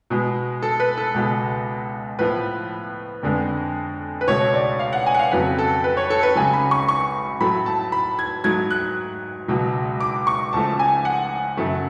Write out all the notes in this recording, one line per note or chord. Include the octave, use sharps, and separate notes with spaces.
B2 G#3 B3
A4
B4
A4
C#2 B2 G#3 B3
A2 F3 B3 B4
F2 D3 G#3 B3
B4
C#2 B2 A3 C#5
D5
F5
F#5
G#5
F#5
F5
F2 C#3 F#3 A3 B4
A4
B4
C#5
A4
B4
C#2 C#3 F#3 G#5
B5
C#6
C#6
A2 F#3 A3 B5
A5
B5
G#6
G#2 F#3 A3 G#6
F#6
C#2 B2 F#3
D6
C#6
C#2 C#3 F3 A3 A5
G#5
F#5
F#2 C#3 F#3 A3